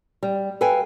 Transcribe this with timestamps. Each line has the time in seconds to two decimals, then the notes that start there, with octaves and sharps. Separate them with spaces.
0.23 G3
0.61 A4 B4 F5 G5 G#5